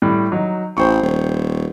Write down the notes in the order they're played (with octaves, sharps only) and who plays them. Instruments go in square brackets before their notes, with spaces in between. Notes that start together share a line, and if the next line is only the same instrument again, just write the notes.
[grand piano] A2 G3
F#3 D#4
[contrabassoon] A1 [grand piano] C5 G5 C#6
[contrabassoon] D#1